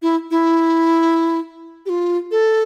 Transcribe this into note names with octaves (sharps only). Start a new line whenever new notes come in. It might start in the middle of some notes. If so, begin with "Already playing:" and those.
E4
E4
G4
F4
A4